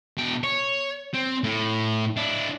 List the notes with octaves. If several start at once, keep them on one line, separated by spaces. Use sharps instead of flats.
B2 G5
C#5
C4
A2
D4 E4